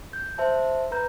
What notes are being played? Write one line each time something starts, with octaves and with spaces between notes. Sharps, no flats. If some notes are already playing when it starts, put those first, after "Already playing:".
G6
C5 E5 A5
B4 A#5 G6